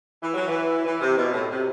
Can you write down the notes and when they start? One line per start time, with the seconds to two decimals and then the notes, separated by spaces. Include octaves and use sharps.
0.22 E3
0.34 F#3
0.48 E3
0.86 E3
1.01 C3
1.16 B2
1.33 A2
1.49 C3